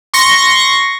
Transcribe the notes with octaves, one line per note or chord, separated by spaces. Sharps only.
C6 C#6 A#6